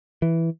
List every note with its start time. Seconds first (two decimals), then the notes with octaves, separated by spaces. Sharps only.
0.22 E3